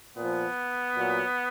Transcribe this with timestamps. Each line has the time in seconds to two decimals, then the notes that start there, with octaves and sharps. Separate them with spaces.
0.17 A#2 F3 B3
0.94 A#2 F#3